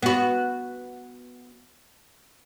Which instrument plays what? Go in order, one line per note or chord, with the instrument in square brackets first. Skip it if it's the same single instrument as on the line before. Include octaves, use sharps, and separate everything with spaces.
[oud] B3 F#4